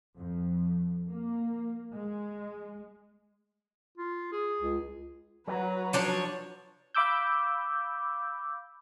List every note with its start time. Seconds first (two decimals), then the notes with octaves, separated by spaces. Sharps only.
0.17 F2
1.10 A#3
1.92 G#3
3.98 F4
4.32 G#4
4.61 C#2
5.47 F#3 B4 A#5
5.93 F3 D4 C#5
6.95 F5 B5 D6 E6 G6